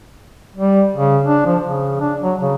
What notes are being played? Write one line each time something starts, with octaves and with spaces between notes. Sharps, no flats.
G3
C#3
D4
F3
C#3
D4
F#3
C#3